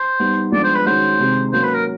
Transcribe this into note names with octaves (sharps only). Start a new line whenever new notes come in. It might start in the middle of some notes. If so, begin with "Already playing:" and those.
Already playing: C5
G3 B3 D#4
F3 G#3 B3 D4 D5
C5
B4
D#3 G#3 C#4 F#4 C5
C3 D#3 G#3 C4 D#4
F#3 A#3 C#4 C5
B4
A#4